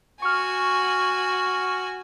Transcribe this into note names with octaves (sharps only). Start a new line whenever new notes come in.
F#4 G#5 C#6 F6